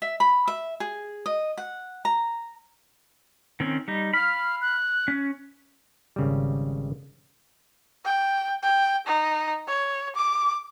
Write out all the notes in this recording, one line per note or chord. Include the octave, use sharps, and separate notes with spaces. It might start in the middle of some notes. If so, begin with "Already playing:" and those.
E5
B5
E5
G#4
D#5
F#5
A#5
D#3 C4 C#4
G3 D#4
F5 B5 F6
F#6
C#4
G#1 C#3 G3
G5
G5
D#4
C#5
D6